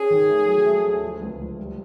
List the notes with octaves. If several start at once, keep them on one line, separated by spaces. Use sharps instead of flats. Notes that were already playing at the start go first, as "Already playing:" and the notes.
Already playing: C#4 G#4
D#3
A3
F#3
A3
D2
F3
C#2
F3
G3